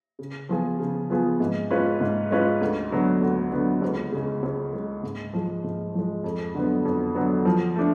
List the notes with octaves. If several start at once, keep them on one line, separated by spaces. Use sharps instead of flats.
C#3
F3 B3 F4 G#4
C#3
F3 B3 F4 G#4
G#2
G#3 C#4 F4 B4
G#2
G#3 C#4 F4 B4
D2
D3 F#3 B3
D2
D3 F#3 B3
C#2
C#3 G#3
C#2
C#3 G#3
G#2
F3 G#3
G#2
F3 G#3
F2
D3 F#3 B3
F2
D3 F#3 B3
F3
A3 D4